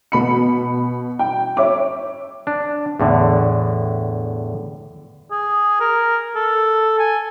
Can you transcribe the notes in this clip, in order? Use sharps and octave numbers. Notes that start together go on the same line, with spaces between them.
B2 B5 C#7
G5
C#5 E5 D6
D4
E2 A2 D3
G#4
A#4
A4
G#5